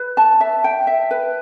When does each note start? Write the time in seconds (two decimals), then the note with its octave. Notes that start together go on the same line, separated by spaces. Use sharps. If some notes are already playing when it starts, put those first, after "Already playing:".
Already playing: B4
0.17 A5
0.40 E5
0.64 G5
0.87 E5
1.11 B4